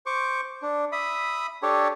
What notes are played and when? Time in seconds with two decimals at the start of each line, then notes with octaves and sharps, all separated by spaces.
0.06 C5 C#6 D6
0.62 D4
0.92 E5 B5 D#6
1.63 D4 G4 A4 C#5